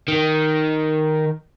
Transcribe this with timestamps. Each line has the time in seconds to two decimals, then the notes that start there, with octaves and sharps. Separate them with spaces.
0.08 D#3